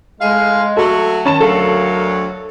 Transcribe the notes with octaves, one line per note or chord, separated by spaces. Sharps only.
A2 G#3 G#4 F5
F#3 A3 F#4 A4
D#3 C#4 A5 E7
D2 F#3 A4 A#4 F5